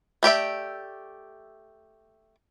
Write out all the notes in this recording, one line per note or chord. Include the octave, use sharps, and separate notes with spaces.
A3 G4 D5 E5